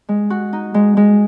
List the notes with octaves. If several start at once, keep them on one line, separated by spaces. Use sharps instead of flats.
G#3
F#4
D#4
G#3
G#3